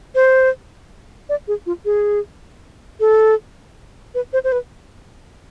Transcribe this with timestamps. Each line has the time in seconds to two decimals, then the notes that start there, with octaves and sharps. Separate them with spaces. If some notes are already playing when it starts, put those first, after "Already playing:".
0.15 C5
1.29 D5
1.48 G#4
1.66 F4
1.85 G#4
3.00 A4
4.15 B4
4.33 C5
4.44 C5
4.52 B4